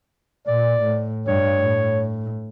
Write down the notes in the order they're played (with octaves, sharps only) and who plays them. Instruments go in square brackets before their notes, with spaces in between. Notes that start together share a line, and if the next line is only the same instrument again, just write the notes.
[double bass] A#2 [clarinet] D5
[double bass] A2
[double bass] G2 [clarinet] C#5
[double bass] A2